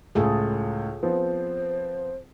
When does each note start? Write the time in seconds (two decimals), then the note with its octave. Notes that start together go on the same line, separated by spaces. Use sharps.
0.15 C#2 A2 F4 G#4 A4
1.03 F3 B3 C4 C5